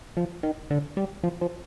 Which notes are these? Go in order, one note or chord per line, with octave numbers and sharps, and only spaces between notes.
F3
D#3
D3
G3
F3
F3